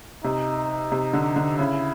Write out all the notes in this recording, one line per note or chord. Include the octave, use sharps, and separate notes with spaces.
C3 D#4
C3
D3
D3
C#3 E4